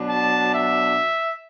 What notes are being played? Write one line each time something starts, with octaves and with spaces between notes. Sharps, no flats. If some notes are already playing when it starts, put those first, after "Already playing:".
Already playing: B2 F#3 D4
A5
E5